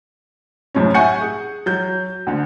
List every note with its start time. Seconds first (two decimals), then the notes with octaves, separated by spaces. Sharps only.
0.75 F#2 A2 C3 C#4
0.94 E5 F#5 G#5 C#6 G6 C#7
1.21 G#4
1.66 F#3 G6
2.27 D2 D3